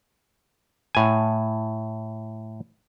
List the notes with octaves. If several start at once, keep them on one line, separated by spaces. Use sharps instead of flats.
A2 G#5